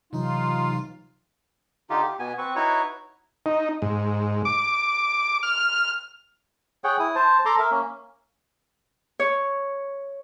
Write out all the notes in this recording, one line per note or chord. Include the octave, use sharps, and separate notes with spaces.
C3 E3 F#3 D#4 F4
D3 D#4 F4 G4
G4
B2 B3 G#5
C4 B4 C#6
D#4 E4 F#4 B4 C#5 C#6
D#4
G#2
D6
F6
G#4 C#5 F#5 G5
E4 D#6
C5 A5
A4 A#5 C6 D6
A#4 E5
A#3 C#4
C#5